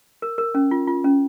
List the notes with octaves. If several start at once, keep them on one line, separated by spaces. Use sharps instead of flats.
A#4
A#4
C#4
F4
F4
C#4